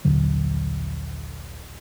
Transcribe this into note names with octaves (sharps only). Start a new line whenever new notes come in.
A#1 D#2 D3 F#3